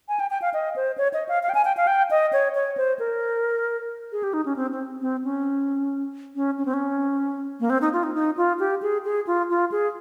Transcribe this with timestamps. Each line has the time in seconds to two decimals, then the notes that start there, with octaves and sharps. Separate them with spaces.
0.09 G#5
0.20 G5
0.31 G5
0.42 F5
0.54 D#5
0.76 C5
0.98 C#5
1.14 D#5
1.29 F5
1.43 F5
1.49 G5
1.55 G#5
1.65 G5
1.77 F5
1.87 G5
2.11 D#5
2.33 C#5
2.55 C#5
2.77 C5
2.99 A#4
4.12 G#4
4.23 G4
4.34 D#4
4.45 C#4
4.56 C4
4.72 C4
5.01 C4
5.24 C#4
6.35 C#4
6.58 C#4
6.65 C4
6.74 C#4
7.60 A#3
7.70 C4
7.81 D#4
7.93 F4
8.03 D#4
8.15 D#4
8.37 F4
8.59 G4
8.82 G#4
9.05 G#4
9.27 F4
9.50 F4
9.72 G#4